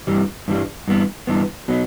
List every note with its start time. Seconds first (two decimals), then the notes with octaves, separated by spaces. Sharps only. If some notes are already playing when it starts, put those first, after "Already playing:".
0.07 G2 E3 G3
0.48 G2 E3 G3
0.88 G2 E3 B3
1.27 G2 E3 B3
1.68 B2 F#3 B3